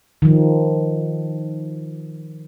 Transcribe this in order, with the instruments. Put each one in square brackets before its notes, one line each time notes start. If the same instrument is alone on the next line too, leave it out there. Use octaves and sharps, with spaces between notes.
[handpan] D#3 F3